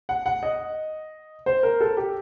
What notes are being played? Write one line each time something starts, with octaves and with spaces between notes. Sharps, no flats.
F#5
F#5
D#5
C5
A#4
A4
G4